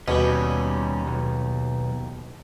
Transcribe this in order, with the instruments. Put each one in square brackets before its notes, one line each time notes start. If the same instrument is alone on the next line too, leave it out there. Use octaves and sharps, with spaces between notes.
[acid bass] D#2 [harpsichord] B2 [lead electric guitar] G3 C#4
[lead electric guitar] B1